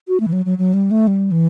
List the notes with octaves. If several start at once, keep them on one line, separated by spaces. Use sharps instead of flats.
F#4
A3
E3
F#3
F#3
F#3
G3
A3
G3
E3